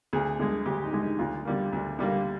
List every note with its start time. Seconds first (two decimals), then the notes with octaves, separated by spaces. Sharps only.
0.13 D2 G#4
0.39 D3 G#3
0.66 D2 G4
0.84 D#4
0.93 D3 G#3
1.02 D#4
1.19 D2 F4
1.45 D3 G3 A#3
1.73 D2
1.99 D3 G3 A#3